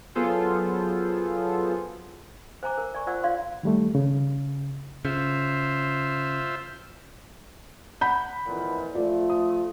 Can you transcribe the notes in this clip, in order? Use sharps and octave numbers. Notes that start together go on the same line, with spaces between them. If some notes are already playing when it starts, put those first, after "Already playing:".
F#3 B3 F4 G#4 A4 C5
C5 G#5 A#5 D6
A#4
D5 G#5 C#6
F4 C5 D5 F#5 E6
F4 C#5 D5 F5 C6
D#3 G3 A3
C#3
C#3 F4 C5 E5
F#5 B5 G6
F2 A#2 E3
F3 A3 F4 D5
D#6